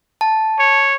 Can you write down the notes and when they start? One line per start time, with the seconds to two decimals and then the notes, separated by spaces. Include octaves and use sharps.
0.21 A5
0.59 C#5